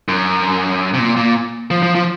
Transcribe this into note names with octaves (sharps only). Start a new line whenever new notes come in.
F#2
C3
A#2
A#2
F3
F3
F3